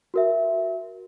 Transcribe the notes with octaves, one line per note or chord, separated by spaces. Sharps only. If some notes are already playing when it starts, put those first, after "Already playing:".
F#4 A#4 E5